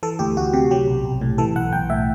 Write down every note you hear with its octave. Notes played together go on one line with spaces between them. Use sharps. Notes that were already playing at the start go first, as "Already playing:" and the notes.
E3 A4
D2 G4
D2 F#4
C3 G4
F#3 G4
B1
B1
A2
E3 A4
B1 F#5
B1 G5
A2 E5